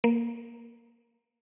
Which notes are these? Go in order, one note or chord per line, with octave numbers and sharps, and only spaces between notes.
A#3